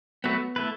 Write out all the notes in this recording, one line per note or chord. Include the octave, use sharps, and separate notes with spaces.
F#3 A3 B3 F#4 B4
A3 E4 B4